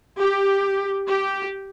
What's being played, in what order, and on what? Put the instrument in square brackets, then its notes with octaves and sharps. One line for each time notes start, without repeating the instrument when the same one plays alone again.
[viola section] G4
G4